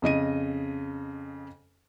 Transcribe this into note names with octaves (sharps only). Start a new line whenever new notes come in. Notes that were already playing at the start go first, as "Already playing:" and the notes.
F2 C#3 D#5 D#7